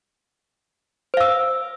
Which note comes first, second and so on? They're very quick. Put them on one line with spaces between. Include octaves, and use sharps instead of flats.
C5 F5 E6